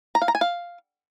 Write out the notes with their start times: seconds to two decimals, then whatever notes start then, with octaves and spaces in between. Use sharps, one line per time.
0.15 A#5
0.22 F5
0.28 A#5
0.35 G#5
0.41 F5